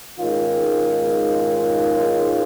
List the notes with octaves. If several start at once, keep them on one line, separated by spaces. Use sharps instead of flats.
G#2 D#3 G#3 C#4 F4